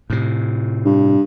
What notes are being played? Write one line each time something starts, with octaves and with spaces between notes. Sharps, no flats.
A2 C3
G2